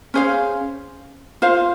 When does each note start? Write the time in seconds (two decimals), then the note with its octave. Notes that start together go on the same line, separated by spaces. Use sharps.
0.14 C#4 G#4 C5 F5
1.42 F4 C5 F5